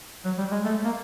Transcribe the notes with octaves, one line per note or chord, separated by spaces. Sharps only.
F#3
G3
G#3
A3
A#3